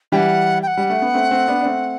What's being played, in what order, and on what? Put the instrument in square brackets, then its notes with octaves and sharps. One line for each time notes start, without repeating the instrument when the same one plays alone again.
[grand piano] E3 G3 [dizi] F#5 G5
[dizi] G5
F#5
[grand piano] G3
A3
B3
A3 C4
A3 C4
B3 D4
D4
A3 C4